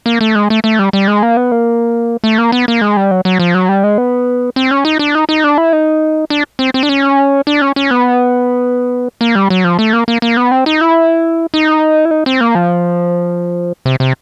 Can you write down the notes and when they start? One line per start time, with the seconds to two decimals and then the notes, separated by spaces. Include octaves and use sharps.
0.06 A#3
0.21 A3
0.35 G#3
0.50 A3
0.64 A3
0.79 G3
0.93 G3
1.08 G#3
1.22 A#3
1.37 B3
1.52 A#3
2.24 A3
2.38 A#3
2.52 B3
2.68 A#3
2.81 G#3
2.97 G3
3.11 F#3
3.25 F#3
3.40 F3
3.54 F#3
3.69 G3
3.84 G#3
3.98 B3
4.56 C4
4.71 C#4
4.85 D#4
4.99 D4
5.15 D#4
5.29 D#4
5.44 D4
5.58 E4
5.73 D#4
6.30 D4
6.59 C4
6.74 C4
6.83 D4
6.89 C#4
7.47 D4
7.62 C#4
7.76 C#4
7.91 B3
9.21 A#3
9.35 G3
9.50 F#3
9.64 F3
9.79 A3
9.93 A#3
10.08 A#3
10.22 A#3
10.37 B3
10.51 C4
10.66 D#4
10.81 E4
11.54 D#4
12.05 E4
12.11 D#4
12.26 C4
12.41 A#3
12.55 F3
13.86 C3
14.00 C3